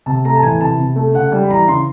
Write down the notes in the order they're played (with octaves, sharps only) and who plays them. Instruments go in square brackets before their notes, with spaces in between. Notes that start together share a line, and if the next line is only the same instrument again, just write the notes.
[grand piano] C3 A5
A3 A#5
A5
E3 G#5
C3 A5
C3
A3
C#3 F#5
G3 G5
B5
E3 A#5
C#3 C6